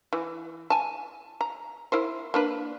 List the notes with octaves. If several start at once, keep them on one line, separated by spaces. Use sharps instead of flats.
E3
G#5 A5
A#5
E4 A#4 C5
A#3 D4 B4